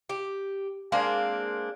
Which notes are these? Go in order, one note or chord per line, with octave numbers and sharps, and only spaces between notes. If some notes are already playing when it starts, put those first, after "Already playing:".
G4
G#3 A#3 C4 D4